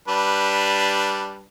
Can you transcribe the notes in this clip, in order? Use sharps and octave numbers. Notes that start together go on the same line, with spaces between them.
G3 D4 B4